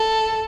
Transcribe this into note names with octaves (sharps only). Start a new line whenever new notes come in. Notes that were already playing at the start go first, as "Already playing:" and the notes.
Already playing: A4